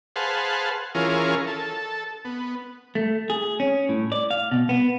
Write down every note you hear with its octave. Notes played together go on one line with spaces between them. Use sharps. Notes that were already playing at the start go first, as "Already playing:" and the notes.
G#4 B4 C5 F5 F#5 A5
E3 C#4 F4 G#4 A#4
A4
B3
A3
G#4
C#4
A2
D5
F5
B2
B3